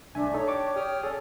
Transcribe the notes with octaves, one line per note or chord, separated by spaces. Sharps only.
C2 A3 D4 E5 G#5
D#4 A4 C#5
D4 G4 D5 C#6 D6
G4 G5 D#6 F6
C#4 G#4 A4 D5